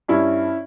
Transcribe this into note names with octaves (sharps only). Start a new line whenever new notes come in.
G2 C#4 E4